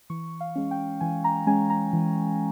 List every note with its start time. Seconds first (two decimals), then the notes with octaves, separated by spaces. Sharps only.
0.10 E3 C#6
0.41 F5
0.56 G#3 C#4
0.71 G5
1.01 E3 G#5
1.24 A#5
1.47 G#3 C#4 G#5
1.70 A#5
1.93 E3